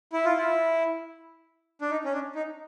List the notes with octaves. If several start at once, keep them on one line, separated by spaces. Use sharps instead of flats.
E4
F4
E4
D4
D#4
C#4
D4
D#4